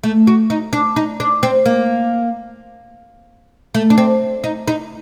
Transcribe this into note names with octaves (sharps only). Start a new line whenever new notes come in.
A3
F#4
D#4
D4
D#4
D4
C4
A#3
A3
D4
C4
D#4
D#4